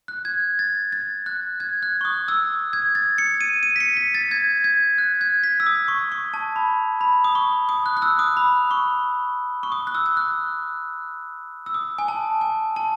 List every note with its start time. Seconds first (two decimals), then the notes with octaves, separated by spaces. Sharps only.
0.08 F#6
0.25 G#6
0.59 A6
0.92 A6
1.26 F#6
1.60 G#6
1.83 F#6
2.01 C#6
2.05 D#6
2.28 E6
2.73 G#6
2.95 A6
3.18 C#7
3.41 D#7
3.63 D#7
3.76 B6
3.80 C#7
3.97 B6
4.14 A6
4.31 G#6
4.64 G#6
4.98 F#6
5.21 G#6
5.43 B6
5.60 E6
5.66 D#6
5.88 C#6
6.12 C#6
6.34 A5
6.56 B5
7.01 B5
7.24 D#6
7.35 C#6
7.69 D#6
7.86 F#6
7.97 F#6
8.02 E6
8.19 D#6
8.37 B5
8.71 C#6
9.63 C#6
9.72 D#6
9.87 F#6
9.95 E6
10.06 E6
10.17 F#6
11.66 E6
11.74 D#6
11.98 G#5
12.08 A5
12.41 G#5
12.76 A5